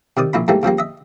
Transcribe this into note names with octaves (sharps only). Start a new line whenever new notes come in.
C3 D#3 D5 D#6
A#1 A#3 E4 B5
G#2 E3 G3 A3 A#3
C#3 F3 G3 A#3
D#5 E5